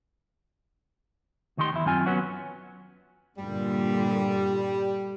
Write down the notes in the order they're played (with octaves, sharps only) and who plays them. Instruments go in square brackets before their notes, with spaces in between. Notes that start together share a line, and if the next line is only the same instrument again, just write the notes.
[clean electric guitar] D2 D#3 D#4 G4 C6
E2 E4
F#2 D#3 C4 F4 G#5
F#3 B3 C#4 F#4
[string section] G2 A#2 D3 [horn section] G3